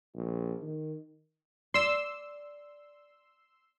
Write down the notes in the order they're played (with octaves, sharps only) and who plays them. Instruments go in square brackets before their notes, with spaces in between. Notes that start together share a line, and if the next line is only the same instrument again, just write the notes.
[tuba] A#1
D#3
[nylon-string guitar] D5 [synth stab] C6 E6